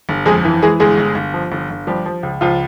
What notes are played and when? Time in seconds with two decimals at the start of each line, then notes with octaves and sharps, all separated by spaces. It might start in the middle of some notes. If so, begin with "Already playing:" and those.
0.09 G1
0.26 F2 G#3 G#4
0.45 E3
0.62 E3 G#3 G#4
0.80 G1 G#3 G#4
0.97 G1
1.15 G1
1.34 F3
1.52 G1
1.70 G1
1.87 F3 G3 G4
2.05 F3
2.23 C#2
2.41 C#2 F3 F4